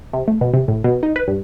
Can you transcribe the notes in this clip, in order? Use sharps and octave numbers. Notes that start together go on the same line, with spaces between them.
C3
A3
B2
C3
A2
B2
D#4
B4
G2